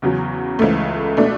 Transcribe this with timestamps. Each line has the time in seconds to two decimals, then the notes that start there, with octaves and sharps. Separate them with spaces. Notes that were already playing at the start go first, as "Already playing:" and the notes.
0.02 E2 C#3 F#3 C#4
0.59 C#2 C#3 E3 A3
1.17 B2 A3 D4